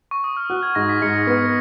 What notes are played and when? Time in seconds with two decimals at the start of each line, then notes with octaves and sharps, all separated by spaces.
0.11 C#6
0.24 D#6
0.37 F6
0.50 F#4 F#6
0.63 G#6
0.75 G#2 A#6
0.89 B6
1.02 G#2 C#7
1.27 B3 C#7